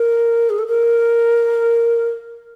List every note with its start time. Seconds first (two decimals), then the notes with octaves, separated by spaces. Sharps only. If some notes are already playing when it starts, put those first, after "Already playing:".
Already playing: A#4
0.50 G#4
0.59 A4
0.67 A#4